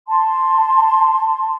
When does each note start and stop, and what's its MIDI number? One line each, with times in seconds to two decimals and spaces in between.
0.07 1.56 81
0.07 1.56 84